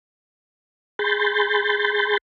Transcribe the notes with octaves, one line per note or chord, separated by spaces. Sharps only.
G#4 B5 C6 G6 A6